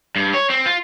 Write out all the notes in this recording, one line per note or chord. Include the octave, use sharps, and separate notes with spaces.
G2
C#5
C4
F4